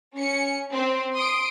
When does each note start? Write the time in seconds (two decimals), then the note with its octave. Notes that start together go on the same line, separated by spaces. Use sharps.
0.16 C#4 C#7
0.72 C4
1.15 C6 D#6 D7